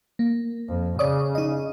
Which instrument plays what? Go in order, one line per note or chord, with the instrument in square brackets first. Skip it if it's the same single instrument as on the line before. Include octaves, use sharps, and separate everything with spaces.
[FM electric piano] A#3
[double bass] F2
[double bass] C#3 [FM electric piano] C#5 D5 D#6
[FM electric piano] D#4 D#5